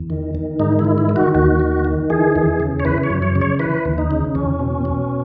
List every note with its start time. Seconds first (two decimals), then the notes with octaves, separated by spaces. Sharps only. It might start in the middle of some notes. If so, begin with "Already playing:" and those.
Already playing: E2
0.10 D#3
0.35 D#3
0.60 G#2 D#4
0.79 E4
0.85 D#3
0.98 E4
1.09 D#3
1.16 F#4
1.35 D#2 F#4
1.60 D#3
1.85 D#3
2.10 E3 G#4
2.35 E2
2.60 C#3
2.80 C#5
2.85 E3 B4
3.03 C#5
3.10 F#2
3.22 C#5
3.35 C#3
3.41 C#5
3.59 E3 B4
3.85 D#2
3.98 D#4
4.11 C#3
4.35 E2 C#4
4.59 B2
4.85 B2